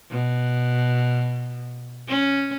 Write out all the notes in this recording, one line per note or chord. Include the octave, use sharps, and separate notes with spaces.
B2
C#4